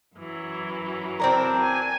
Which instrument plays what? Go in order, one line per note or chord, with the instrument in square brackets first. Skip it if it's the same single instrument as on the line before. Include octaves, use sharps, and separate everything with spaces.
[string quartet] F#2 E3 F#3
[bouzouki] C4 D4 A#4
[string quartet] G#5